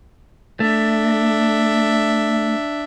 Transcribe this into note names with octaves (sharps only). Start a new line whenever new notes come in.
A3 D4 E5